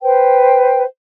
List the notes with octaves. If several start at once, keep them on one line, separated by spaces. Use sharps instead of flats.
B4 C5 G5